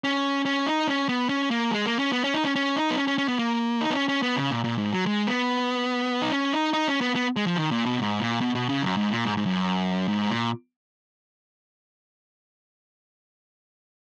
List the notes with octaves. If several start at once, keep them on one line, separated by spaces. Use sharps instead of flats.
C#4
C#4
D#4
C#4
B3
C#4
A#3
G#3
A#3
C#4
B3
C#4
D#4
C#4
C#4
D#4
B3
C#4
C#4
C#4
B3
A#3
D#4
B3
C#4
C#4
B3
C#3
A#2
A#2
G#2
F#3
G#3
B3
D#4
C#4
D#4
D#4
C#4
B3
B3
G#3
F3
D#3
A#2
B2
G#2
A#2
B2
B2
C#3
F#2
G#2
A#2
G#2
G#2
F#2
G#2
A#2